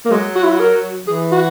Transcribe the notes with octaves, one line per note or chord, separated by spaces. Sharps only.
A#3
F#3 G#3
F#4
E4
F#4
A#4
E3 G#4
F#4